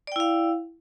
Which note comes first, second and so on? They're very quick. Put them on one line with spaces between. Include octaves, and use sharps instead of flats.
D5 G5 E4 F5